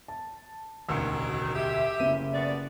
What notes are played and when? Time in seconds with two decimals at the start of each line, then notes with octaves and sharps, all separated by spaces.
0.08 A5
0.89 E1 A1 D2 D#3 F#3 E6 C#7
1.55 G4 E5
2.00 F#1 E4 D#7
2.32 B2 B3 D5